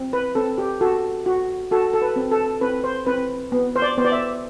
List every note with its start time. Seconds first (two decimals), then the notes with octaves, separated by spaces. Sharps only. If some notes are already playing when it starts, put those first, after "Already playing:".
Already playing: C4
0.13 B4
0.35 C4 A4
0.58 G4
0.81 F#4 A4
1.26 F#4
1.71 F#4 A4
1.94 A4
2.02 B4
2.16 C4
2.32 A4
2.61 C4 B4
2.84 C5
3.06 C4 B4
3.52 B3
3.76 C5
3.82 D5
3.98 B3 C5
4.05 D5
4.12 E5